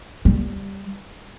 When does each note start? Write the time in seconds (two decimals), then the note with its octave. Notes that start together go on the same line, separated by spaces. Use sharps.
0.25 G3